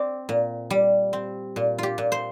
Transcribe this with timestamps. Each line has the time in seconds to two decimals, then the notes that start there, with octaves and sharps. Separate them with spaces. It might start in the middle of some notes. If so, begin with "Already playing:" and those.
Already playing: C4 D5
0.29 A#2
0.70 G3
1.13 C4
1.56 A#2
1.78 F4 G4
1.98 A#2
2.12 C5